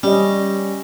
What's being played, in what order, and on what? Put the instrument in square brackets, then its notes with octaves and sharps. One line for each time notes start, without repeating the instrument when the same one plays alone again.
[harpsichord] G3 [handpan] C#4 D#5